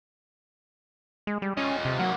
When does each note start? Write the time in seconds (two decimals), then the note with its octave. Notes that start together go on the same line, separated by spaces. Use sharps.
1.27 G#3
1.42 G3
1.57 C#4 F4 D#5
1.85 C3
2.00 F#3 A#3 F#5